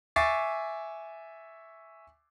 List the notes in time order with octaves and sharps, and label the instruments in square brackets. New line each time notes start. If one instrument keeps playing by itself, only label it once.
[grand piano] E5 G#5 C#6 D6 A6 C7